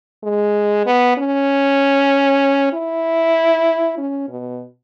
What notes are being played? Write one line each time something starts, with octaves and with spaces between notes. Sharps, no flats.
G#3
B3
C#4
E4
C#4
B2